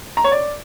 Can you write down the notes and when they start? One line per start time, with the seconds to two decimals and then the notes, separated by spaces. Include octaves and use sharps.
0.17 A#5
0.24 C#5
0.32 D5